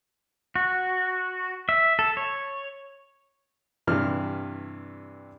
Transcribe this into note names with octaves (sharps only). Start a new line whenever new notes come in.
F#4
E5
A4
C#5
G2 C3 E3 F6